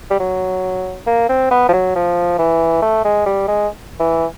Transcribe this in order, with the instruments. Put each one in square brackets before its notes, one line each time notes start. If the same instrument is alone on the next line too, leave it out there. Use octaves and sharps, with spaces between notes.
[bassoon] G3
F#3
A#3
C4
B3
F3
F#3
F3
E3
A3
G#3
G3
G#3
E3